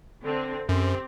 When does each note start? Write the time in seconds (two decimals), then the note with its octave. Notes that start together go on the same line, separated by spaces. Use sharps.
0.23 D3 C4
0.69 F#2 C4 G4